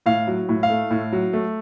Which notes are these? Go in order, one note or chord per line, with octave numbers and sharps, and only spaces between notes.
A2 F5
F#3
A2
F5
A3
A2
F#3
A3